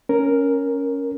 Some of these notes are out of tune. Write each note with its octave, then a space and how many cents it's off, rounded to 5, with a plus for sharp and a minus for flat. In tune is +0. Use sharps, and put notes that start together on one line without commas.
C#4 +0 A#4 +0